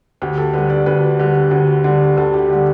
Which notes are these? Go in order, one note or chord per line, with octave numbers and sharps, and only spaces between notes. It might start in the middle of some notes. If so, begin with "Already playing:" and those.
D2 G4
A4
D3 G3 B4
D5
D2 B4
D3 G3
D2
D3 G3
D2 A4
G4
D3 G3